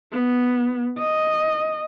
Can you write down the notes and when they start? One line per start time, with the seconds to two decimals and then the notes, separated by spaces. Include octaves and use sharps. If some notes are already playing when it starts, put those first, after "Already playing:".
0.12 B3
0.98 D#5